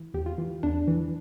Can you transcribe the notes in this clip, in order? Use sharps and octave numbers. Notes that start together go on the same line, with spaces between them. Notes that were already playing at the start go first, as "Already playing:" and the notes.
Already playing: E3
E2 G4
F4
E3
E2 D4
E3